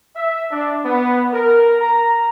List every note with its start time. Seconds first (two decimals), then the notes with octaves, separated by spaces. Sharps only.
0.16 E5
0.52 D4
0.85 B3
1.34 A#4
1.81 A#5